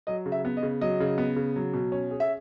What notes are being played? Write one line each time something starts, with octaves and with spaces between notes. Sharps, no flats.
F#3 D#5
C#3
E5
B3
D#5
C#3
F#3 D#5
C#3
B3
C#3
F#3
B2
C#4
G#4
E5